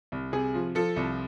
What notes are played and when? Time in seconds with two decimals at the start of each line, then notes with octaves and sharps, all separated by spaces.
0.12 C2
0.32 C3 G#4
0.54 F3
0.75 F3 A4
0.96 C2